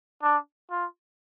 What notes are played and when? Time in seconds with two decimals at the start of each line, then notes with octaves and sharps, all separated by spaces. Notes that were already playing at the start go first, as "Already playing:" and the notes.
0.23 D4
0.71 F4